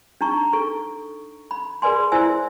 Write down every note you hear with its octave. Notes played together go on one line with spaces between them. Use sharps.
D4 D#4 A#5 C#6
A4 C#6
B5
G#4 A#4 B4 D5 G#5 C6
E4 C5 D5 E5 G#5 E6